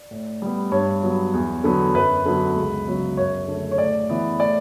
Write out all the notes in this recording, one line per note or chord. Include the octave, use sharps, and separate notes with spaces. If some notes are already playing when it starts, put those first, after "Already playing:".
Already playing: D5
A2
G3 B3
G2 C#5
F#3 B3
E2
D3 F#3 B3
F#2 B4
D3 F#3 B3
C#2
C#3 F#3 B3
F#2 C#5
D3 A3
C#5
A2 D5
E3 B3
A2 D5